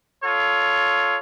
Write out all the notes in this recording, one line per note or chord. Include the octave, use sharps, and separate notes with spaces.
F4 A4 C#5